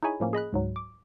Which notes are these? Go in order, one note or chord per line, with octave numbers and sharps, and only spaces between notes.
D#4 E4 G#4 C#5 G#5 B5
A2 F3 A#3 C#4
G#4 D#5 B5 F#6
C#2 G#2 F#3
D6